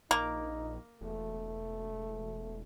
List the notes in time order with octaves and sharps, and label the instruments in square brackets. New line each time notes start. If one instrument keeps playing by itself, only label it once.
[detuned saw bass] A#1 [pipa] A#3 [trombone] D#4
[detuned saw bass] E1 [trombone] A3